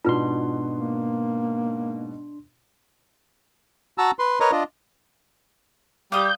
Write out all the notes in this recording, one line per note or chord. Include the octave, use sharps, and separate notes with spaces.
G#2 B2 B3 D4 F4 B4 C6
A#3
F#4 A5 A#5 E6
B4 C6
A#4 B4 C#5 D#5 A#5
D4 F4 D#5
G3 F5 D6 D#6 G6